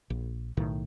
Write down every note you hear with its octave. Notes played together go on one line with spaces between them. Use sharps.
A#1
B1 A2 D#3